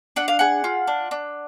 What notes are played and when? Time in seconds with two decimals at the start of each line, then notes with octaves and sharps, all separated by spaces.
0.16 D4 F#5
0.28 F5
0.39 G#4 F#5
0.64 F4
0.87 D4
1.11 D4